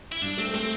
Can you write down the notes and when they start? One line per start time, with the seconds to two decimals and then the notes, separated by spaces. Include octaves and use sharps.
0.12 E4
0.22 G2 D4
0.38 A3 C4
0.54 A3 C4